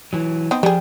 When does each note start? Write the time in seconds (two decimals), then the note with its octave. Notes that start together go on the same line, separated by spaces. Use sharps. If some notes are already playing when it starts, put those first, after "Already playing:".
0.13 E3 F#3
0.51 B3 C4 D#4
0.63 F3 G3 G#4 C5 G5